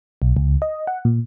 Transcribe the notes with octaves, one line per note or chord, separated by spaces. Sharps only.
B1
C#2
D#5
F#5
A#2